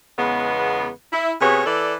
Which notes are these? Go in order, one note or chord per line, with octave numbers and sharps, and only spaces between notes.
E2 C#3 G#3 B3
E4
C3 B3 F#4 G#4 C#5
E3 A4 D5